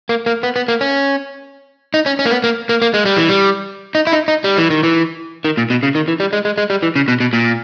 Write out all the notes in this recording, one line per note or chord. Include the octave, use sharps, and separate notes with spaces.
A#3
A#3
B3
B3
A#3
C#4
D#4
C#4
C#4
A#3
B3
A#3
A#3
A#3
G#3
G3
E3
G3
D#4
E4
D#4
D#4
G3
E3
D#3
E3
D#3
A#2
B2
C#3
D#3
E3
G3
G#3
G#3
G#3
G3
E3
C#3
B2
B2
A#2